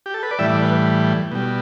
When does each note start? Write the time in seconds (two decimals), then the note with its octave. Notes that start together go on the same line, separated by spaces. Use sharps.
0.06 G4
0.14 A4
0.23 B4
0.31 D5
0.39 A2 E3 G3 E5
0.50 D5
0.62 B4
1.32 B2 G3